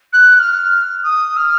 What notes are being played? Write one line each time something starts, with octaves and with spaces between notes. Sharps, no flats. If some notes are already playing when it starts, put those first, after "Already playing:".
F#6
F#6
F6
D#6
F6